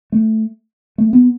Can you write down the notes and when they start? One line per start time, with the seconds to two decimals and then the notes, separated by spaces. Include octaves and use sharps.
0.12 A3
0.98 A3
1.13 B3